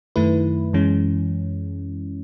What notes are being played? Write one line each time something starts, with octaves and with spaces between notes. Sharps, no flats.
F#2 D#3 A3 E4 B4
F#2 E3 G#3 C#4